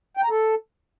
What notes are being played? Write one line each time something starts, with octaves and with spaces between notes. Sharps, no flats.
G5
A#5
A4